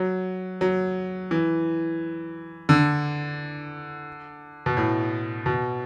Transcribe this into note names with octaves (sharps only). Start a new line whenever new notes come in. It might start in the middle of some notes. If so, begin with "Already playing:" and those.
Already playing: F#3
F#3
E3
D3
B2
A2
B2